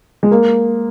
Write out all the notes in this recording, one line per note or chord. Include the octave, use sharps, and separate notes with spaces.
G#3
A#3